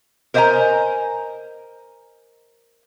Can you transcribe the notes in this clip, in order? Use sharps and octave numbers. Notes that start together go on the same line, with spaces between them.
A#4 C5 D#5 E5 G#5 A#5